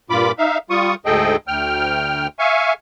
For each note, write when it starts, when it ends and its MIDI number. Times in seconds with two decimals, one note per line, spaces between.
0.10 0.32 43
0.10 0.32 46
0.10 0.32 65
0.10 0.32 83
0.10 0.32 86
0.38 0.58 63
0.38 0.58 76
0.38 0.58 77
0.70 0.95 55
0.70 0.95 65
0.70 0.95 85
0.70 0.95 87
1.06 1.36 38
1.06 1.36 44
1.06 1.36 68
1.06 1.36 69
1.06 1.36 75
1.06 1.36 79
1.47 2.27 38
1.47 2.27 79
1.47 2.27 89
2.39 2.73 76
2.39 2.73 77
2.39 2.73 80
2.39 2.73 85